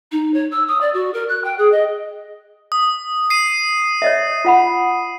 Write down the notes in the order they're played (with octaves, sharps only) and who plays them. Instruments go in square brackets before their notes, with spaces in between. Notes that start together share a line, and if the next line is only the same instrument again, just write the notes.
[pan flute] D#4
C#5
E6
D#6
D5
F#4
A#4
F#6
G5
G#4
D#5
[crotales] D#6
C7 D#7
[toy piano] C#5 D#5 E5
F4 F#5 B5